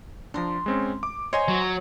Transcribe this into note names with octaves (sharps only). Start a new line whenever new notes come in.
F3 D4 A#5 C6
G#3 C4 C#4
D6
C5 C#5 D#5 G#5 A#5
F#3